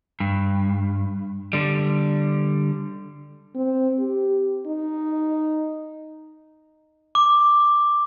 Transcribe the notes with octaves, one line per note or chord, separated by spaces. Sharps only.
G2
D3 G3
C4
G4
D#4
D6